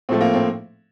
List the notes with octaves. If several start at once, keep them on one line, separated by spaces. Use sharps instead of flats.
A2 F3 A3 C4
A#3
C4